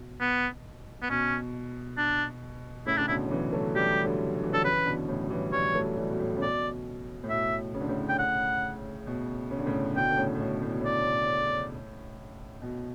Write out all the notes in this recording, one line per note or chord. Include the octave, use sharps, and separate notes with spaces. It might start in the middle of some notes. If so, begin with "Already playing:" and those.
Already playing: B2
B3
B3
B2 C#4
D4
A2 C#3 E4
C#3 D4
B2 D3 E4
F#3
C#3 E3
F#3 A3
E3 G3 G4
G3
D3 F#3
F#3
E3
D3 F#3 A4
C#3 E3 B4
B2 D3
A2 C#3
F#3
E3 G3
E3 G3 C#5
F#3 A3
E3 G3
B2
A2
C#3
B2 D5
A2
B2 E5
C#3
D3
A2 C#3
G5
F#5
B2
C#3
D3
A2 C#3
B2 D3 G5
D3
A2 C#3
A2
B2
A2
B2
A2 D5
B2